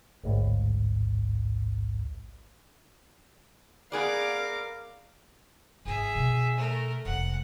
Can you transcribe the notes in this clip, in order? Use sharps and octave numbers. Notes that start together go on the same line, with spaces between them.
A1 D2 G#2
B3 G#4 A#4 D5 F5 D6
G#1 G#4 E5
B2 D#3
A3 A#4
F1 G#3 F#5